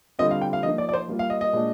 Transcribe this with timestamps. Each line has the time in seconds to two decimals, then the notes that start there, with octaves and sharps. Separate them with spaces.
0.19 D3 G3 C4 F4 D#5
0.31 F5
0.42 G5
0.53 F5
0.63 F3 A#3 D#4 D#5
0.78 D5
0.89 D5
0.94 C5
1.08 G3 A#3 F4
1.19 F5
1.30 D#5
1.41 D#5
1.53 A#2 G#3 D4